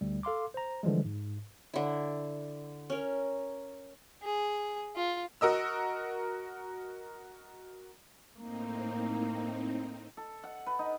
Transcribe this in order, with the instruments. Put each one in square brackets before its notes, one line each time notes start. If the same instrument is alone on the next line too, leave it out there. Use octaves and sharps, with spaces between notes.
[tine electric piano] D2 G3
A4 F5 C6 D6
C5 A#5
D3 E3 F3 G3 G#3
G#2
[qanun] D3 E4
C#4 A#4
[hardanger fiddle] G#4
F4
[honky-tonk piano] F#4 A#4 D#5 E6
[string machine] A2 C4 D#4 [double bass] A#3
[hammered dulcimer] A4
F#5
B4
D#4